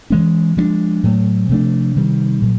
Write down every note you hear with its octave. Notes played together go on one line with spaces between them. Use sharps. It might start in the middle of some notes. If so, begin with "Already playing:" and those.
E3 G#3 C#4
F3 G#3 B3 D4
A2 F#3 A3
C3 F3 A3 D4
C3 D#3 G3
A#2 F#3